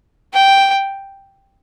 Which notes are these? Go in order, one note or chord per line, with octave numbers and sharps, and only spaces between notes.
G5